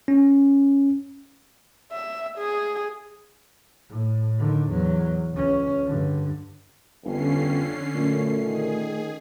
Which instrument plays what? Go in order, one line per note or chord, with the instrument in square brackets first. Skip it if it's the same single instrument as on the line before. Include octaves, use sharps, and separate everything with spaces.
[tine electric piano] C#4
[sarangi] E5
G#4
[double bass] A2
D3 D#3
E2 F#3
C#2 C#4
G2 D3
[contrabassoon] G1 [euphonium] F2 [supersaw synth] D3 C#4 C7
[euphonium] F#2 [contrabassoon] A#2 [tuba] A3
[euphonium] D#3 [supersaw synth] G#4